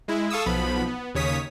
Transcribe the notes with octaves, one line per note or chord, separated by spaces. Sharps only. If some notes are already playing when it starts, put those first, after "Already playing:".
G#3 E4
A4 F5 C#6 D#6 E6
B1 F3 B3 B5
B3
D#2 C#3 C#5 D#6 B6